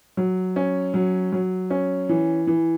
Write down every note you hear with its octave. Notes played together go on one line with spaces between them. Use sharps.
F#3
C#4
F#3
F#3
C#4
E3
E3